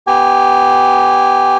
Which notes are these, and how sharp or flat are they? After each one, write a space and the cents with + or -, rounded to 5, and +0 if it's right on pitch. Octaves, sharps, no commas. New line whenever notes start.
B3 +0 G4 -10 G#5 -20